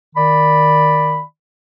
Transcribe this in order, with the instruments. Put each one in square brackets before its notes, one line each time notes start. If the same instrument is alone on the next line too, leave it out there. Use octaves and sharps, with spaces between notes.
[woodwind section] D#3 D5 B5